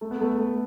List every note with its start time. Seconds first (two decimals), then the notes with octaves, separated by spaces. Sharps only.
0.01 A3
0.11 B3
0.21 A3
0.38 A3